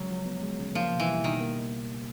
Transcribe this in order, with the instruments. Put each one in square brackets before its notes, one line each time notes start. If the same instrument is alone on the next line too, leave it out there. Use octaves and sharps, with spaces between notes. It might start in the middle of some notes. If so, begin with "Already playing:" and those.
Already playing: [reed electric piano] C#3 G#3 [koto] F#3
[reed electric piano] F3
B3
G#3
C#3
[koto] F3 [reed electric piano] A#3
[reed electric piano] B2
[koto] E3
[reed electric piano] G3
[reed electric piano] B2 [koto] D#3
[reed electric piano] A#3